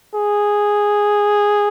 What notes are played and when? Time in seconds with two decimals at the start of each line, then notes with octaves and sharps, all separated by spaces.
0.15 G#4